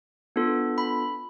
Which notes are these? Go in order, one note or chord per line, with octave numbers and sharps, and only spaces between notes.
B3 D4 F4 A4
B5